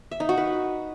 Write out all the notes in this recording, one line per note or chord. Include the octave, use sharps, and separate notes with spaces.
E5
D#4
F#4
B4